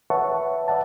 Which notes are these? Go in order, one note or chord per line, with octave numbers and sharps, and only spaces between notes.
B4 C#5 E5 F#5 A5 C#6
B4 D5 E5 F#5 A5